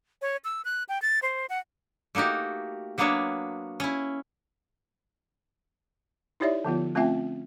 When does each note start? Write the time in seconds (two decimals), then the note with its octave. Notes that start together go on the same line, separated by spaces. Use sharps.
0.22 C#5
0.45 E6
0.65 F#6
0.89 G5
1.02 A6
1.22 C5
1.49 F#5
2.15 A3 A#3 D#4 F#4 G4
2.98 F#3 A#3 B3 D4 C#5 E5
3.80 C#4 E4
6.40 D#4 E4 G4 C#5 D5 E5
6.64 D3 F3 B3 F4
6.95 A3 C4 C#4 F4 E5 G5